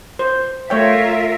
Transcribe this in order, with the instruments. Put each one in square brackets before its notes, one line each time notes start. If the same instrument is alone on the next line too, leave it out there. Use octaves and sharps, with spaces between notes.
[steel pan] C5
[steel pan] A3 C#5 G5 [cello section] F4 A#4 E5